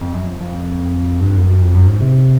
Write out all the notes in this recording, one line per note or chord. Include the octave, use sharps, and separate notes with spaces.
F2
F#2
F2
F2
G2
F2
F#2
F2
F#2
G#2
C3